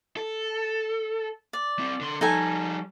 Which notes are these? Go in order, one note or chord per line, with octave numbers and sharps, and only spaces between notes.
A4
D5
C4 E4
D3 C6
F3 G3 D#4 A4 G#5